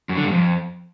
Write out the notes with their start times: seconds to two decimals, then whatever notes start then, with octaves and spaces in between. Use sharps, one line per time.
0.09 F#2
0.17 D3
0.24 G2
0.32 F2